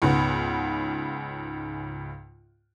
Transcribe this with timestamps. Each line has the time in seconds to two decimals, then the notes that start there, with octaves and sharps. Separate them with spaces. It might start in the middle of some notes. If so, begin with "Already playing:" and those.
0.02 C#2 G#2 C#3 B3 F#5